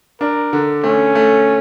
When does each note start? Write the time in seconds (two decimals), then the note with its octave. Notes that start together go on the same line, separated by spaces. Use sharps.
0.21 D4 A#4
0.53 D3
0.83 A3 C#4
1.15 A3